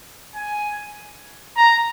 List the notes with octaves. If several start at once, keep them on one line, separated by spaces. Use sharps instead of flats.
G#5
A#5